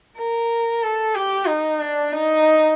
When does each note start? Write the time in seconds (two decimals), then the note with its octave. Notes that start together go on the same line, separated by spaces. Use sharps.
0.17 A#4
0.82 A4
1.15 G4
1.47 D#4
1.80 D4
2.12 D#4